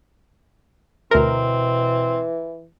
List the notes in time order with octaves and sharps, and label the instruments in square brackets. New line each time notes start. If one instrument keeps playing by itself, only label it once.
[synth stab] D2 A#4 [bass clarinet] B2 [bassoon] E3 [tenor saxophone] C4